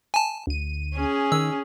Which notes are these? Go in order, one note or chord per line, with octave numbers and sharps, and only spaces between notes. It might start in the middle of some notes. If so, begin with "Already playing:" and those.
G#5 A5
D2 D#7
C#4 G#4
D#3 E6